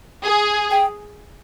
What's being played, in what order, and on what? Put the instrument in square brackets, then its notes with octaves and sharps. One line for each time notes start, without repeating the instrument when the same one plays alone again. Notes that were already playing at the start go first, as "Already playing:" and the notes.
[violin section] G#4
[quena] G5